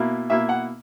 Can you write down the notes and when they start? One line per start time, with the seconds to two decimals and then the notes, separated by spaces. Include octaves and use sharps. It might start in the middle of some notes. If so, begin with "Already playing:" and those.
Already playing: B2 A#3 E4
0.30 B2 A#3 E4 E5
0.49 F#5